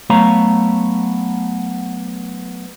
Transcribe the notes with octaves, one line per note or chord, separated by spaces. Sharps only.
F#3 A3 B3 C#5 F5 A#5